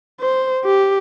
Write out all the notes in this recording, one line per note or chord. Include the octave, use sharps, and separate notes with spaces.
C5
G4